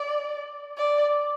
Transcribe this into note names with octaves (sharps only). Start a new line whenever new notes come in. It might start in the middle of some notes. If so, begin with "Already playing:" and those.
Already playing: D5
D5